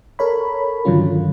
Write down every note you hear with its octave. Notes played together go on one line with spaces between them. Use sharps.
A4 A#4 C#5 B5
G2 D3 D#3 F#3 C#4 F4